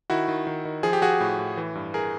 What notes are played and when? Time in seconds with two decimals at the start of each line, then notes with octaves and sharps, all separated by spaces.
0.10 D#3 E4 F#4
0.28 D#3
0.47 D#3
0.65 D#3
0.83 F3 G#4
0.93 G4
1.02 F3 F#4 G#4
1.20 A2
1.39 A2
1.57 E3
1.75 G2
1.94 G#4 A#4